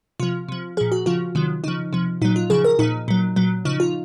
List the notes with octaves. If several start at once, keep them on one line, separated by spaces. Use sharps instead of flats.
C3 F3 F4
C3 F3
A#2 F3 G#4
F#4
C#3 F3 F4
C3 D#3 F#3
C#3 F3 D#4
C3 F3
A#2 F#3 D#4
F4
C#3 F3 G#4
A#4
A#2 F3 D#4
A#2 F#3
A#2 F#3
C#3 F3 D#4
F4